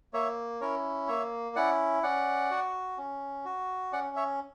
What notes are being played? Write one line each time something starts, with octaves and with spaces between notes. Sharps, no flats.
A#3 C#5 E5
C#4 E4 A#4 C#5
A#3 C#5 E5
C#4 E4 D5 F#5
C#4 D5 F#5
F#4
C#4
F#4
C#4 D5 F#5
C#5 E5